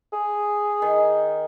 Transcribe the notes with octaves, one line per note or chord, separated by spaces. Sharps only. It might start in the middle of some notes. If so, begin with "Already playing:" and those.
G#4
D#3